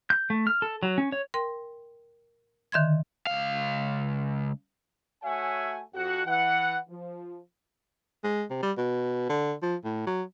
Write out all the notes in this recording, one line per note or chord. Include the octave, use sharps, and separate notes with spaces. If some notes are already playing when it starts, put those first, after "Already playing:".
G6
A3
F6
A4
F#3
C#4
C#5
A#4 G5 C6
D3 D#3 E5 C6 G#6
C#2 F5
A3 F#4 C#5 E5 F#5 G#5
F2 F#4 F#5
E3 F#5
F3
G#3
C3
G3
B2
D3
F3
A2
F#3